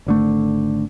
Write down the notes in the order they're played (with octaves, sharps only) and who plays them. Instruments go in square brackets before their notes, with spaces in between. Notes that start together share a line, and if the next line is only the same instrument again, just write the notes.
[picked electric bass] G#1 D3 A3